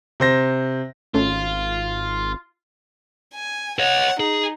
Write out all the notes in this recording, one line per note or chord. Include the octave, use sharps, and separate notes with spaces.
C3 C5 A#6
G#1 A3 C#4 F4
G#5
C#5 D#5 F#5
D#4 G#4